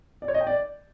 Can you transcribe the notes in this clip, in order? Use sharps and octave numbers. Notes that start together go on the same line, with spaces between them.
D5
C#5
D#5
G5
D5